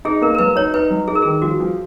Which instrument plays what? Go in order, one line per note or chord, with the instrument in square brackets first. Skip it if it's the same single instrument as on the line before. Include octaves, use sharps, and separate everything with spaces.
[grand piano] D#4 [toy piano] G#4
[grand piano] A#3 [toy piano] A#4
[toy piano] A#4
[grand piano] F#3 [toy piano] B4
[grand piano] D#4 [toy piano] C#5
[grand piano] D#4 [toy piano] B4
[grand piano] F#3
[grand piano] D#4 [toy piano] G#4
[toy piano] A#4
[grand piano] D#3 [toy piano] G#4
[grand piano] F3 [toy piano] F#4
[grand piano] F3